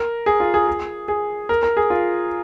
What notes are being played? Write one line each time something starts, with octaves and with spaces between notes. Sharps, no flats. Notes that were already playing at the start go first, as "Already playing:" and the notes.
Already playing: A#4
G#4
F4
G#4
G#4
G#4
A#4
A#4
G#4
F4